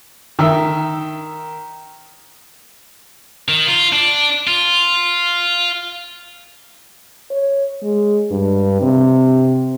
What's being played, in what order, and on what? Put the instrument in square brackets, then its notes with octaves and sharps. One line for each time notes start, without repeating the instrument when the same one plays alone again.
[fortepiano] D#3 E5
[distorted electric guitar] D#3
F4
D4
F4
[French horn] C#5
G#3
G2
C3